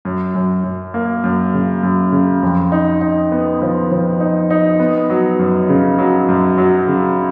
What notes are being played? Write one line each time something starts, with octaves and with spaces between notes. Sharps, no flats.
F#2
F#2
F#2
A#3
F#2
C#3
F#2
C#3
F2
D#4
D#4
B3
F3
F3
D#4
D#4
B3
F#3
F#2
C#3
F#3
F#2
F#3
C#3